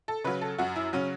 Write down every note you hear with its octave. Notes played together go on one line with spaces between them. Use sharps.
A4
C#3 F#3 B4
A4
F#2 F#4
E4
C#3 F#3 C#4